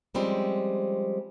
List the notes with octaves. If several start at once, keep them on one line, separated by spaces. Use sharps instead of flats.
F3 G3 G#3 C4 C#4